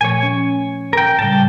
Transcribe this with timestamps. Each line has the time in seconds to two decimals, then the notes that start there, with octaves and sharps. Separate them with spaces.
0.01 A#2 F3 A3 C#5 G#5
0.23 C#4
0.93 A#4 G5
1.19 A2 C#3 G3 G5 A5